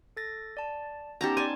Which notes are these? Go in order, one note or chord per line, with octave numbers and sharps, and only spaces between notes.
A4 A6 A#6
D5 A5
B3 C#4 D#4 G4 A5 A#5
D5 G#5 A5 C6